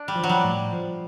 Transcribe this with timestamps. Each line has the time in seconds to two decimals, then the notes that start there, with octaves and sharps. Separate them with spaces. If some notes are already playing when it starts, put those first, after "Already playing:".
Already playing: D4
0.08 G3
0.15 F3
0.24 F#3
0.29 G3
0.44 A2
0.73 F3